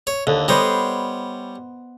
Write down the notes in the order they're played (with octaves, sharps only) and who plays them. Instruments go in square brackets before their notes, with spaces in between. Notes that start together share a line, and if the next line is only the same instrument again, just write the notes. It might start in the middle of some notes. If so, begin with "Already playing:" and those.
[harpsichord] C#5
[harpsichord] D#2 [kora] D3
[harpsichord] G3 C#5 [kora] B3 C5 D#5